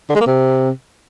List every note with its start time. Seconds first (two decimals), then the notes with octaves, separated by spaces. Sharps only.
0.10 D3
0.15 G#3
0.21 A#3
0.26 C3